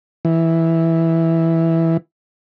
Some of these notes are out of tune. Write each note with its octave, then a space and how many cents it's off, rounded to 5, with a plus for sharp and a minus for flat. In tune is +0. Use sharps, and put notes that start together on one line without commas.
E3 -5